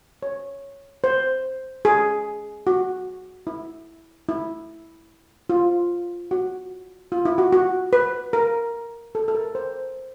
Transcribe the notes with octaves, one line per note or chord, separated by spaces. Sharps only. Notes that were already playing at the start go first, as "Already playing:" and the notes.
C#5
C5
G#4
F#4
E4
E4
F4
F#4
F4
E4
F#4
F#4
B4
A#4
A4
A4
A#4
C5